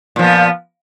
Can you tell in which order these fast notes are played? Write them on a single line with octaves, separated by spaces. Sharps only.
A#2 F3 B3